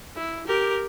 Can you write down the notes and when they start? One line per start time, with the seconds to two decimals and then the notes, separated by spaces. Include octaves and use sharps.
0.16 E4
0.46 G4 A#4